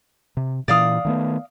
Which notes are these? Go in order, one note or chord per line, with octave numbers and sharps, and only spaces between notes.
C3
A#2 E3 D5 F5 D#6
D#3 A3 B3